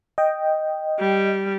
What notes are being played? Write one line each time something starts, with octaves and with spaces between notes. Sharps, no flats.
D#5 G5
G3